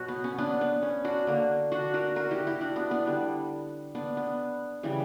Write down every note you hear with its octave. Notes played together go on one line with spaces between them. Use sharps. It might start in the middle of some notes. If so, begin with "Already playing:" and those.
Already playing: B2 F#3 F#4
B3
C#4
B3 D4
B3
C#4
D4 F#4
D3 A#3
D4 F#4
F#4 A#4
F#4 A#4
E4 G4
E4 G4
D4 F#4
B3 D4
B3 D4
D3 G3 B3
B3 D4
B3
C#3 E3 G3